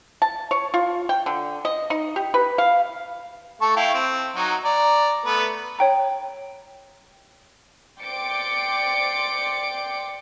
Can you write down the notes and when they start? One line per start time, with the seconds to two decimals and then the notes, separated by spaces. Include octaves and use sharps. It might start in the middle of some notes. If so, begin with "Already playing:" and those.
0.22 A5
0.51 C#5
0.74 F4
1.09 G5
1.26 D3
1.65 D#5
1.90 D#4
2.16 G4
2.34 B4
2.58 F5
3.61 A3 A5 C#6
3.77 E4 F5 G5
3.94 C4
4.36 F#3 D#4 F#4
4.65 D5 A#5
5.25 A3 B3 B4
5.79 C#5 G5 A#5
8.01 D5 G5 C6 D6 C#7 D7